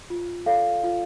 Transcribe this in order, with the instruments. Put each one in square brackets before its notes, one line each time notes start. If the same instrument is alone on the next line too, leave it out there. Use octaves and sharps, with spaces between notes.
[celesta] F4
A4 D5 F5
F4